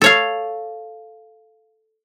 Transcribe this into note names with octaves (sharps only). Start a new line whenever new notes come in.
A4 C#5 F5